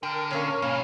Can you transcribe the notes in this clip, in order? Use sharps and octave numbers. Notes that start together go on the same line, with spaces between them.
D3 A#4 G5
A#2 C#4 C#5 F5
G#2 B2 A#3 C#4 F5